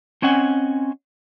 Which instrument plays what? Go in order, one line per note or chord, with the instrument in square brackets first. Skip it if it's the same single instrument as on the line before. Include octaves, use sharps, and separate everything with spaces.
[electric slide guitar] C4 C#4 D#5 F#5 G#5